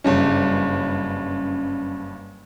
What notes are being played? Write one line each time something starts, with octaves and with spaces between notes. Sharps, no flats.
F#1 G2 C#4